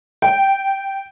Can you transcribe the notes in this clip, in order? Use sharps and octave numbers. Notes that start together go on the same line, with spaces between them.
G5